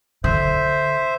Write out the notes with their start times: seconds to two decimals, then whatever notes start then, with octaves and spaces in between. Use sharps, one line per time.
0.24 D3 C5 E5